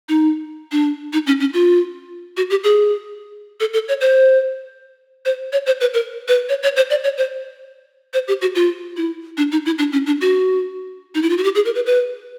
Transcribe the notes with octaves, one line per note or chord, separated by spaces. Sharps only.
D#4
D4
D#4
C#4
C#4
F4
F#4
G4
G#4
A4
A4
C#5
C5
C5
C#5
C5
B4
A#4
B4
C#5
C#5
C5
D5
C#5
C5
C5
G4
F#4
F4
E4
D4
D#4
E4
D4
C#4
D4
F#4
D#4
E4
F4
F#4
G4
G#4
A#4
B4
B4